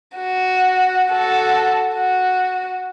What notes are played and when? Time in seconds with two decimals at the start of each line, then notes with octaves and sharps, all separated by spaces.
0.16 F#4
1.10 F#4 A4
1.96 F#4